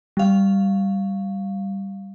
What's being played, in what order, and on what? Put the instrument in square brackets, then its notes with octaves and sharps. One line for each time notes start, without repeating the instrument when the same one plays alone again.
[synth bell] G3 F5